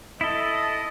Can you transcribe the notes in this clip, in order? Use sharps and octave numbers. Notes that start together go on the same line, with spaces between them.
E4 A4 D#5